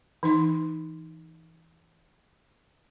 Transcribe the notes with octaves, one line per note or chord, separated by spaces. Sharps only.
E3 D#4 C6